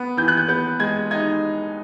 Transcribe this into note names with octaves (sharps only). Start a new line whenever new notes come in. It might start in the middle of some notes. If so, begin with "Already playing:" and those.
Already playing: B3
E3 G6
F#6
G6
B3 G6
G#3 G#6
D#4 G#6